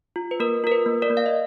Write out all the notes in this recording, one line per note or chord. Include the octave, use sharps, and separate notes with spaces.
F4
B4
A#3 A#4
F4 A#4
B4
A#3
A#4 D5
A#3
F5
D#5